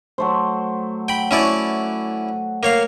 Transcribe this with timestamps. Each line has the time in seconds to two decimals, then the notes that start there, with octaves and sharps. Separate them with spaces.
0.18 F#3 A3 C5
1.08 G5 B5
1.31 A3 C#4 E4 F#4 D5
2.63 A#3 C#5 F5